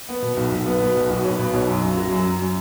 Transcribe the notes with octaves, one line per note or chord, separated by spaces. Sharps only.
B3
B2
B1
B1
B3
B2
B1
B1 F#4
B3 C#5
B2 B4
B1 C#5
F#2
C#4
F#3
F#2
F#2
C#4